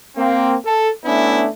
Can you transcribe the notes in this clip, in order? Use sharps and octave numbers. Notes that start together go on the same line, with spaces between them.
A#3 C4
A4
A3 B3 C#4 D4 E4